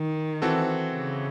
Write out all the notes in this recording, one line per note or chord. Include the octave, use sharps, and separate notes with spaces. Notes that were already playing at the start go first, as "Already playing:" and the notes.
Already playing: D#3
E3 C4 F#4 A4
C#3